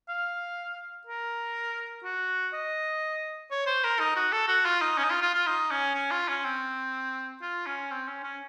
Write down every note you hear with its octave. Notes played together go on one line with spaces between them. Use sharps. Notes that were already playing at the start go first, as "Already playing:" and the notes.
F5
A#4
F#4
D#5
C#5
C5
A#4
D#4
F#4
A4
F#4
F4
D#4
C#4
D#4
F4
F4
F4
D#4
C#4
C#4
F4
C#4
C4
F4
C#4
C4
C#4
C#4